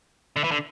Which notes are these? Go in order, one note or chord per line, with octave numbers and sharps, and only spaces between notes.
D3
E3
D3